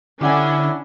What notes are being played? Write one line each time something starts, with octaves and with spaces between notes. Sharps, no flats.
D3 C#4 D4 E4 G4 F#5 G#5